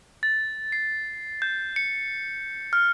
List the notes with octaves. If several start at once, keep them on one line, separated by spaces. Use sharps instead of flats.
A6
C7
G6
C#7
F6